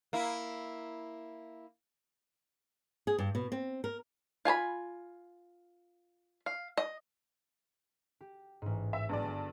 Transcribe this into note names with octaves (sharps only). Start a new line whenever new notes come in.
A#3 E4
G#4
G2
B2
C4
A#4
F4 G#5 A5 B5
F5
D#5
G4
A1 G#2
E5
G2 F#3 G#3 B3 D5
G1